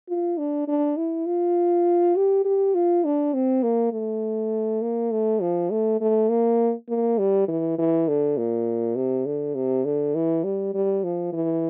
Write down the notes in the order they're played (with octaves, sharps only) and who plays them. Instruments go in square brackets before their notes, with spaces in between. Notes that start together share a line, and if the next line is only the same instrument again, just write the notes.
[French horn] F4
D4
D4
E4
F4
G4
G4
F4
D4
C4
A#3
A3
A#3
A3
F3
A3
A3
A#3
A#3
G3
E3
E3
D3
A#2
C3
D3
C3
D3
E3
G3
G3
F3
E3